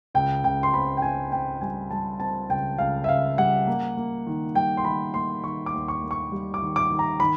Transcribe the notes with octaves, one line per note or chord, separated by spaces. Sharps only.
C#2 G5
C#2 G5
C6
C4 B5
G5
C4 G#5
C4 G5
G3 G#5
G3 A5
C4 A5
C#2 G5
C#2 F5
E5
C#2 F5
G3 F#5
A#3
A#3
D#3
G3 G5
C6
D#3 B5
A#3 C6
D#3 C#6
D6
D#2
C#6
A#3
C#6
G3
D6
D#3
D6
D#3
A#5
D#3 B5